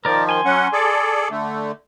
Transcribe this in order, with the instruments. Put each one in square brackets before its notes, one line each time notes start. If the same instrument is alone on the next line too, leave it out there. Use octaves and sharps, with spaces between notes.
[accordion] D#3 F3 [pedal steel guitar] A#4 D5
[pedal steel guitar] G#5 C6
[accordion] F#3 C#4 F#5
G#4 A4 D5
D3 A3